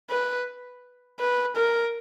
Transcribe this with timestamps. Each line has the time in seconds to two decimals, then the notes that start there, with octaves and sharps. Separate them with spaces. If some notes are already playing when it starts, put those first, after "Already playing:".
0.10 B4
1.20 B4
1.56 A#4